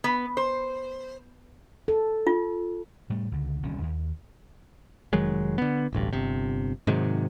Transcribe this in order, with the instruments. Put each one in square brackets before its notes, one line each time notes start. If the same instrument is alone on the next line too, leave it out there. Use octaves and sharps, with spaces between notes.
[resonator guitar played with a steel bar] B3
C5
[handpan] A4
[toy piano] F4
[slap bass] A2 G3 A3
C#2 D3
D#1 C2 D3 C#4
D#2
[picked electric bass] F1 D#3 F#3 G#3
D3 B3
D1 A1 G2
G1 C3
G#2 C3 D#3 F#3